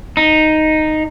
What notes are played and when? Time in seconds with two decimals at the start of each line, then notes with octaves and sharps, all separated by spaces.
0.17 D#4